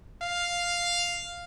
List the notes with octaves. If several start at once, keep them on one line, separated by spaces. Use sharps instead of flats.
F5